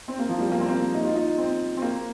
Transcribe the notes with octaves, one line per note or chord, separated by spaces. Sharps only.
C4
A#3
F3
G3
A#3
C4
A#3
D#4
F4
D#4
C4
C4
A#3